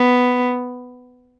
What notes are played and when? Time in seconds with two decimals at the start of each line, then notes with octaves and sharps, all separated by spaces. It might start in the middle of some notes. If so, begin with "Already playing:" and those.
Already playing: B3